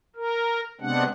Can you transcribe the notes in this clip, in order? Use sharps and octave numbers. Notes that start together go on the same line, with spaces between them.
A#4
C3 G#3 B3 C4 D4 F#5